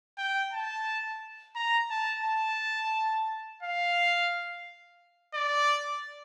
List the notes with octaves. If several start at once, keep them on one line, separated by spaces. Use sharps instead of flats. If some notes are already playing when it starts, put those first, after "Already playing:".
G5
A5
A#5
A5
A5
F5
D5